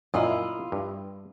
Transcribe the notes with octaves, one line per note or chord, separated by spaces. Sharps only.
F#2 A#2 E4 F4 D#5
G2